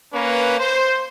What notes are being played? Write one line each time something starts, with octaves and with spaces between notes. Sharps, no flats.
A#3 C#4 B4
C5